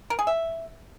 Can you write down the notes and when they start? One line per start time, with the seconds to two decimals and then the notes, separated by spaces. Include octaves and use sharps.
0.10 A#4
0.19 G#4
0.27 E5